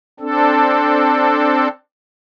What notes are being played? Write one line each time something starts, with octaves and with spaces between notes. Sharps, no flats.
C4 D4 A4